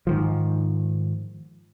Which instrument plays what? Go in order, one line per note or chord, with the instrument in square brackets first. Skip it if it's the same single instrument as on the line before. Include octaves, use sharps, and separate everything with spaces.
[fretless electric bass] G#2 D#3 F3